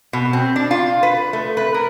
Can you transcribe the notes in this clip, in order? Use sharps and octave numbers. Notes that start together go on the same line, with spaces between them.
B2
C4
D4
F4
B4
A3
B4
A#4